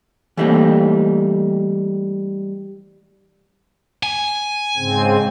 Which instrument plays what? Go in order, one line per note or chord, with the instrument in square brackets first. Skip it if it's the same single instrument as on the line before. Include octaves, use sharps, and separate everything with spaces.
[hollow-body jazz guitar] E3 G3 A3 A#3 C4 D#4
[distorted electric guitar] G#5
[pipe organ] G#2 C#3 C4